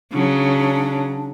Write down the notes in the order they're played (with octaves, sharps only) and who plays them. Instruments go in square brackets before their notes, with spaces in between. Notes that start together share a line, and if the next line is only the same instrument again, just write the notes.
[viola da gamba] C#3 F#3 [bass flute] D4